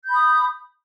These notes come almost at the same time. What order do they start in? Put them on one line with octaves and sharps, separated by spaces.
G6 B5 D#6